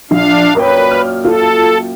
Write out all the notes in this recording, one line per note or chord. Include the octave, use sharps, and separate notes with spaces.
A#1 D4 F5
F#2 A#2 A#4 B4 G5
F6
F4 A4